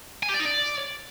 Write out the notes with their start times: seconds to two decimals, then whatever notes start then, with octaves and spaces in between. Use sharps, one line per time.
0.23 G#5
0.29 G4
0.34 D5
0.40 D#4
0.45 D5